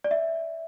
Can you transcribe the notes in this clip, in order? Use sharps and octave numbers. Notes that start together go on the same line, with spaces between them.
D5
E5